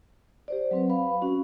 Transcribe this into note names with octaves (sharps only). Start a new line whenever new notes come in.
G4 C5 D5
F#3 C4 B4
B4 F5 B5
C#4 F#4 B4